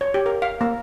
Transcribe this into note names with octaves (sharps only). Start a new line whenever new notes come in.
C#5
G4
A#4
F5
A#3